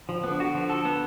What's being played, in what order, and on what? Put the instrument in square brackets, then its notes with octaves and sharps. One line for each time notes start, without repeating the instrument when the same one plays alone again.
[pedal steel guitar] F3
[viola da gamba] D3 [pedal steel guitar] B3
[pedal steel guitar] F#4
F3
A4
B3